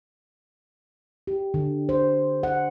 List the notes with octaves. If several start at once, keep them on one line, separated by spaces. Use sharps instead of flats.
G4
D3
C5
F#5